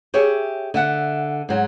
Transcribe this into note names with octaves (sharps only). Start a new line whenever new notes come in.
G4 G#4 C#5 E5
D3 E5 F#5
G#2 F#3